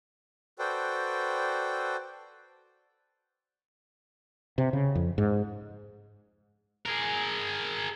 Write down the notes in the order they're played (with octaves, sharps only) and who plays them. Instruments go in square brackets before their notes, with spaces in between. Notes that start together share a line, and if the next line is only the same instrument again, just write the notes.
[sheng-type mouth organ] F#4 A4 B4 C5 D5 G5
[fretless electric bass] C3
C#3
F2
G#2
[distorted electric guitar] G#4 A#4